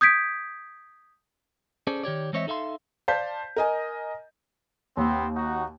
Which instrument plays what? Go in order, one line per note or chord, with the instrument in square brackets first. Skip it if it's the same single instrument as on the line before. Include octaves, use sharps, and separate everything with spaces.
[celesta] D#6 G6 G#6 B6 D7
[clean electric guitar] C#4 G#4 A4 C5 D5
D#3 G4 C#5 D5
E3 G#3 C4 C#5 D#5 E5
D#4 A4 E5 F5 C6
[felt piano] C5 D5 F5 A5 G6 B6
A#4 D#5 G#5
[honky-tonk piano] D#2 [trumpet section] B3 C4
[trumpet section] D#4 F#4